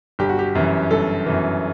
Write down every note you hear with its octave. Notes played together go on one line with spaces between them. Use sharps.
G1 G4
F#4
G4
F#2 E3
G1 A4
F#2 E3